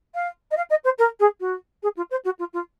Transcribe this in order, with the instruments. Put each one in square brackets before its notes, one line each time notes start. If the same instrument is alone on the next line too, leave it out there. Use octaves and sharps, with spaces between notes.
[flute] F5
D#5
F5
D#5
C5
A#4
G#4
F#4
G#4
F4
C5
F#4
F4
F4